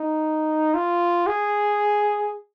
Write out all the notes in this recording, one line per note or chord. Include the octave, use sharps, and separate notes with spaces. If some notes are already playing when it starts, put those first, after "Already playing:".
Already playing: D#4
F4
G#4